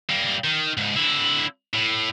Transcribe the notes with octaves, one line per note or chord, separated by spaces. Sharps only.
G3 A#3
D#3
C#2 G#2
D3 E4
A2